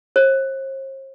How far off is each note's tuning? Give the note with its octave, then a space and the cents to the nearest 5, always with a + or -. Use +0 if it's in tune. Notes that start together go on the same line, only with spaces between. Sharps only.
C5 +45